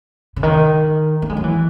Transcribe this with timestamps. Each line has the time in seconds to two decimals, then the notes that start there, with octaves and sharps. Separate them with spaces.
0.36 C#3
0.43 D#3
1.22 A3
1.30 G#3
1.37 F#3
1.44 E3